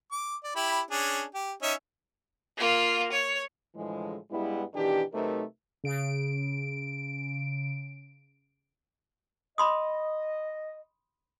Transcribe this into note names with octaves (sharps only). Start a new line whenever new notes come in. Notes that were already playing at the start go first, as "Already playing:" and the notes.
D6
D5
E4 G4 B5
C#4 D4 G#4
G4
C#4 D#4 E5
A#3 F4
C#5
A2 D3 E3 F3 G#3
G2 G3 G#3 B3 E4
B2 D#3 E3 D4 G4
C3 F#3 A3 D#4 A#4 B4
C#3 D7
D#5 B5 C6 D#6